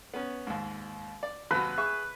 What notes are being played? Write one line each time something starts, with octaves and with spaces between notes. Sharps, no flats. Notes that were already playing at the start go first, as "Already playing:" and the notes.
B3 C#4
D#2 G#2
D5
D#2 C3 F#3 B4
G#4 E5 C#6